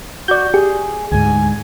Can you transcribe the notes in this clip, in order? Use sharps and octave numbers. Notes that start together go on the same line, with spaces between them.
F#4 D5 G6
G4 G#4
D2 G#2 G#5